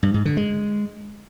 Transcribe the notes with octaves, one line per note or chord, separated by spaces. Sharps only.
G2
G#2
D3
G#3